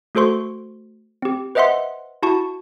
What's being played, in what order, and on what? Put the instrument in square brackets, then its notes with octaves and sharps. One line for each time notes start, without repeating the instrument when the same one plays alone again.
[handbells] A3 F#4 A4 C5 C6 C#6
C4 G4
B4 C5 D#5 E5 F#5 C6
E4 F#4 A5 C#6